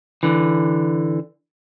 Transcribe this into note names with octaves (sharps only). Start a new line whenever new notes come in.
D3 E3